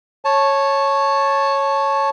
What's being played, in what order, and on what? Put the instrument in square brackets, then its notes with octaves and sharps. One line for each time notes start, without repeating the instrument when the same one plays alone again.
[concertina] C#5 A5